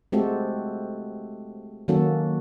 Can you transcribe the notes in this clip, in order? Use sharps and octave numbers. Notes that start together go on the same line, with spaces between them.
G#3 A3 C4 F#4 G4 A4
D#3 F#3 A#3 C#4 F#4 A4